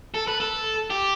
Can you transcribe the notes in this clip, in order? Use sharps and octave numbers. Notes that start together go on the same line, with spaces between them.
A4
B4
A4
G4